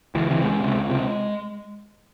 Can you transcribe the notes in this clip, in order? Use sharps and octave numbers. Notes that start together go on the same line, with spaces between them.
C#2 E3
C3 E3
C#2 G#3
C3
C#2
C3